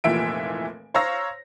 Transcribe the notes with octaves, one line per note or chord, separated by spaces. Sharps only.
F1 A#2 E3 E5 D7
C5 C#5 F5 A#5 E6 A#6